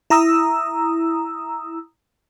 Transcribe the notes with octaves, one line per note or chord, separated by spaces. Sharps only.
E4 A#5 D#6 E6